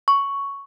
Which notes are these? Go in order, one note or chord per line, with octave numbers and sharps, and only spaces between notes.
C#6